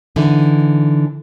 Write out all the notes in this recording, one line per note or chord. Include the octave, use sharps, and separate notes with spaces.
D3 E3 D#4